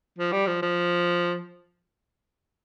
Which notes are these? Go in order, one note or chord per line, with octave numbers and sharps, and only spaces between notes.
F3
G3
F3
F3